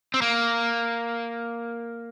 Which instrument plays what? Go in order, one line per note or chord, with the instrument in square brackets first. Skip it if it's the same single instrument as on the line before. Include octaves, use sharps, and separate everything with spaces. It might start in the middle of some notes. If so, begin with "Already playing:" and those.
[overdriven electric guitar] C4
A#3